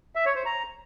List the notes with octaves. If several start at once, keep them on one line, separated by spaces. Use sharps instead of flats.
E5
C#5
C5
A#5